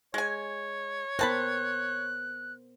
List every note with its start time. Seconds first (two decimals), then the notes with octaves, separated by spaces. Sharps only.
0.14 G#3 C#5 G#5
1.19 B3 C4 A#4 C5 A5 B5 F#6